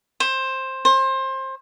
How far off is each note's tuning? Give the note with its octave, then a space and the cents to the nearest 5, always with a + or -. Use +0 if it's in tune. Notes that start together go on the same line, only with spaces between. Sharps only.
C5 +15
C5 +25